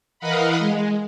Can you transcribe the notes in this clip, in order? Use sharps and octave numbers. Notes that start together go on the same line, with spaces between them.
E3 A#4 D#5 F5 F#5 B5
G#3